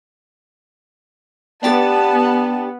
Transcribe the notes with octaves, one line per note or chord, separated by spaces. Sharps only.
B3 D4 G4 A5 A6